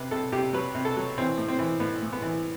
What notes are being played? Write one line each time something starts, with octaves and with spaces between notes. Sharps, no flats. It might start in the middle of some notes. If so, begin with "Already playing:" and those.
Already playing: C3 B4
C3 A4
C3 G4
F#3 B4
C3
A4
F#3
E3 C4
A2
C4
E3
A2 B3
A2
B3
E3